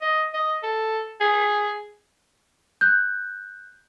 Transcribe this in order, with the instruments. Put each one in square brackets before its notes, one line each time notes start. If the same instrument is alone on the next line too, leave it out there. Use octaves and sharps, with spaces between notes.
[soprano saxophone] D#5
D#5
A4
G#4
[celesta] F#6 G6